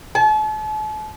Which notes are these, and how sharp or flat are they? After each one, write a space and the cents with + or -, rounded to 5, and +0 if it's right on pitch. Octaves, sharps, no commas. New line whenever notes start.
A5 -40